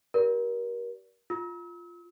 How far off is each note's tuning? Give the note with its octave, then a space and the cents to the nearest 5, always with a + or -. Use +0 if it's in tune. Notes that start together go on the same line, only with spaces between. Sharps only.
G4 -35 A#4 +30 D5 -30
F4 +0 E6 -40